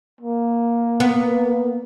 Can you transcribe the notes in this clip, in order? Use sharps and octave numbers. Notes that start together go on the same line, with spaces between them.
A#3
B3